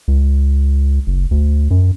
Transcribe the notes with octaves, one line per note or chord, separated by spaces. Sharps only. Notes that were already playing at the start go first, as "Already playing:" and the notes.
C#2
F#1
D2
F#2